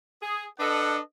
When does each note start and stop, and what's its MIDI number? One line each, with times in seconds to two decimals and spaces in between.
0.22 0.44 68
0.59 0.98 62
0.59 0.98 69
0.59 0.98 71
0.59 0.98 75
0.59 0.98 78